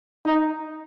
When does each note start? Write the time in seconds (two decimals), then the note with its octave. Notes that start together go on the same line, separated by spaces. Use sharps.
0.25 D#4